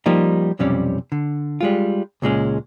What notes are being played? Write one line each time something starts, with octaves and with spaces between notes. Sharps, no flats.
F3 G3 A#3 D#4
B1 F2 C3 G3 C#4 D5
D3
G3 G#3 F4
C#2 A#2 G#3 C#4